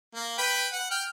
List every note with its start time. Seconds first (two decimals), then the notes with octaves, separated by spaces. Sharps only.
0.15 A#3
0.38 B4 G5 B5
0.73 F#5
0.91 G5 F6